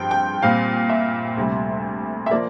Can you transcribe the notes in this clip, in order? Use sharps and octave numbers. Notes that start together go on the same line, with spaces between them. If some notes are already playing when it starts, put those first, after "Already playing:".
Already playing: G2 F3 C4 G5 C6
G5
A#2 G3 C4 F5
E5
D2 C3 G3
E5
F3 A#3 D5